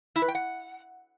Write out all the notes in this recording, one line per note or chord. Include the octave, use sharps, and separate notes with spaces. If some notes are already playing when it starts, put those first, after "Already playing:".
E4
B4
G5
F#5